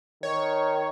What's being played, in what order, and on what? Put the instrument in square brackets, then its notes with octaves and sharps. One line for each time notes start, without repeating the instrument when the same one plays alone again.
[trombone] D#3 [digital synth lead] C#5